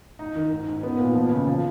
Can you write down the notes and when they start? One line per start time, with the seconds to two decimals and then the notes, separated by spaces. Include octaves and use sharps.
0.19 D#4
0.35 D#3
0.51 G#2
0.68 G#2
0.83 B3
0.99 A#2
1.15 F3
1.32 C#3
1.47 F3